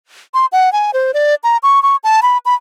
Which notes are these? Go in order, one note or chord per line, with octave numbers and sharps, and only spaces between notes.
C6
F#5
G#5
C5
D5
A#5
C#6
C#6
A5
B5
B5